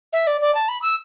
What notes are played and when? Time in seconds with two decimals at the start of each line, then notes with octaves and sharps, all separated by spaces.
0.12 E5
0.26 D5
0.40 D5
0.54 A5
0.68 B5
0.82 E6